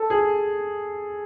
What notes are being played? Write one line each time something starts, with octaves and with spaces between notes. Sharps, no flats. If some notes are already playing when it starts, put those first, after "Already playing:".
Already playing: A4
G#4